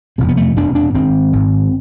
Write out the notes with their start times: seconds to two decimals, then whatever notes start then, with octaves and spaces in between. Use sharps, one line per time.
0.18 F1 E2 B2 C4
0.28 B3
0.37 A3
0.56 F1 E2 B2 D4
0.75 D4
0.94 G#1 G#2 C4
1.33 G#1 G#2